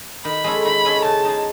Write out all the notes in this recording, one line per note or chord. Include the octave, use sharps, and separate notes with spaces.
D#3 B5
G#3 C#4 E4 A4
D#3 B5
G#3 C#4 E4 A4
C#3 A5
G#3 D#4